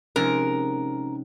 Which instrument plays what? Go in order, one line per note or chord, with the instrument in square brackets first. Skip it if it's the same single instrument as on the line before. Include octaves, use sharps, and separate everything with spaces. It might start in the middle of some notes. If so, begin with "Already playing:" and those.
[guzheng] C3 F3 G#3 [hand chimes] C#4 D#4 [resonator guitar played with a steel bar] A#4